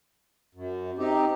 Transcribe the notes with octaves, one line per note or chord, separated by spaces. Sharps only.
F#2
C4 D#4 G4